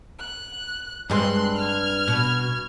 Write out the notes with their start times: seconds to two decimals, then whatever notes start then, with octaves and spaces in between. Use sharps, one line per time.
0.20 F#6
1.10 G2 G#3 C4 C6 F#6
1.57 F6 G#6
2.08 B2